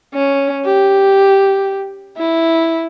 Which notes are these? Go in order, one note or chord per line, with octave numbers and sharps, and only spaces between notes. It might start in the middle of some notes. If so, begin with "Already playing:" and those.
C#4
G4
E4